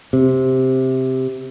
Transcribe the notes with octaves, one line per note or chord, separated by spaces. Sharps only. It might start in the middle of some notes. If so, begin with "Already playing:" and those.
C3